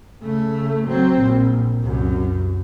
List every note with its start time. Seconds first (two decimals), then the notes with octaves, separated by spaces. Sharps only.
0.22 C#3 A3
0.86 F#3 C4
1.20 A#1
1.80 C2 F#2